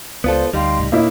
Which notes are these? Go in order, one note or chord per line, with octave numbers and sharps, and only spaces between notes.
C#2 B3 F4 A4 C5 D5 F5
D2 G3 D#4 F5 G5 C6
C#2 A2
A#2 A#3 D#4 E4 C#5